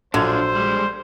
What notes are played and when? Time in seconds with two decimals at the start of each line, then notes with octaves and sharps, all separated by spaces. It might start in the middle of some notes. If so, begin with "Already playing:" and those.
0.14 A#1 D3 F#3 D4 F4 C5 G#6
0.55 G3 G#3